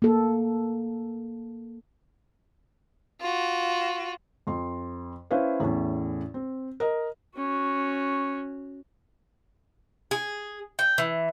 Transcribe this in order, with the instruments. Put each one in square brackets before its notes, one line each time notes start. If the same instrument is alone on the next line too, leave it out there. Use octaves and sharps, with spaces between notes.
[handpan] A#3 A4
[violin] F4 F#4
[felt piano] F2 C6
C#4 E4 B4 C5 F5
E2 A2 C#4
C4
A#4 D#5
[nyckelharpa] C#4 F#4
[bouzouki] G#4
G5
E3